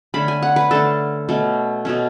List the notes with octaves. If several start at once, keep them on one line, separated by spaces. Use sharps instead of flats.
D3 A3 C#4 B5
G#5
F#5
B4
D3 A3 C#4 A4
B2 A3 C#4
B2 A3 C#4